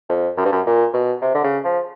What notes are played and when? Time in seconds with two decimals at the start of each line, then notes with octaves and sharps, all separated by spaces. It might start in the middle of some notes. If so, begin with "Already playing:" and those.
0.09 F2
0.37 F#2
0.45 G2
0.52 F#2
0.66 A#2
0.93 B2
1.21 C3
1.34 D3
1.44 C#3
1.64 F3